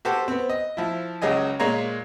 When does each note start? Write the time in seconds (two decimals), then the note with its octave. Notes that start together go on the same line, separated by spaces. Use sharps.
0.05 F#4 G4 A4 C5
0.28 B3 C4
0.50 D#5
0.77 F3 E4
1.22 C#2 C#3 F#3 D#5 G#5
1.59 A#2 G#3 A#3 C#5 A#5